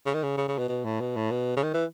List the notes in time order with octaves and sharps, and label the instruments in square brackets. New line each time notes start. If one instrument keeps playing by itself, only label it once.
[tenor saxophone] C#3
D#3
C#3
C#3
C#3
B2
B2
A2
B2
A2
B2
C#3
D#3
E3